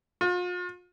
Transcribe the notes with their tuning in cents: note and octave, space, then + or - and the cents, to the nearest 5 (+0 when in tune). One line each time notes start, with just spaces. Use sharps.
F4 +40